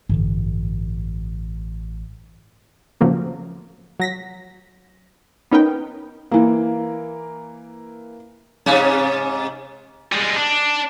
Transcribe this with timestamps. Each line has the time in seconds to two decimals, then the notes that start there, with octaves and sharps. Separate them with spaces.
0.09 A1 G2 D3 E3
3.01 A2 C#3 F3 F#3 A3 A#3
4.00 F#3 A#6 B6
5.51 B3 C#4 D#4 A#4 B4 G5
6.31 E3 A#3
8.66 G#2 C3 C#4
10.12 G3 G#3
10.36 D4